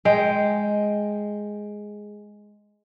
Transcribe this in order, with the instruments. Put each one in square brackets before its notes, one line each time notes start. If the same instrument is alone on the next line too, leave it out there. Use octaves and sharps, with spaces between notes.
[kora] G#3 G5